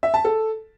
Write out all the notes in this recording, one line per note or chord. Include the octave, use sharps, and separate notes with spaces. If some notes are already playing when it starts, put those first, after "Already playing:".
E5
A5
A4